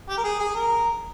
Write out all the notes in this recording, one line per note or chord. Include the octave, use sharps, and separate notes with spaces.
G4
A#4
G#4
G#4
A#4